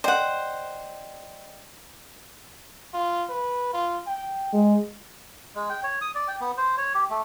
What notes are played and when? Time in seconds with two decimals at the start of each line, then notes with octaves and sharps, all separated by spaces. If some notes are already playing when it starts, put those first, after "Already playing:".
0.04 C5 D5 D#5 F#5 G5
2.94 F4
3.29 B4
3.73 F4
4.07 G5
4.53 G#3
5.55 G#3
5.70 G5
5.84 C#5
6.01 D#6
6.15 D5
6.28 G5
6.41 B3
6.58 C5
6.78 C#5
6.95 G4
7.10 A3